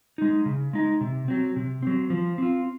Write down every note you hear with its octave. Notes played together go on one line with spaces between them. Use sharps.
G#3 D#4
C#3
G#3 D#4
C3
F#3 C4
C3
F#3 C4
F3
C4 F4